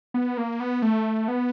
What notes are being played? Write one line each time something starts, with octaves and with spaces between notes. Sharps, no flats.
B3
A#3
B3
A3
B3